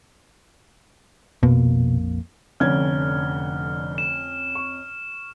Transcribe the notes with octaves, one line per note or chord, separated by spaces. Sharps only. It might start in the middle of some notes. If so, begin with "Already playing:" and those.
A#1 F2 B2 A#3
F1 F2 D3 C#4 F6 G#6
E7
C#6